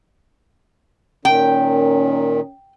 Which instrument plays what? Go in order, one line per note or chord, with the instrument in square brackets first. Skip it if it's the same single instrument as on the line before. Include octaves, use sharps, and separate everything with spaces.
[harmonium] A#2 D#3 [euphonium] C#4 [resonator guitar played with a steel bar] G5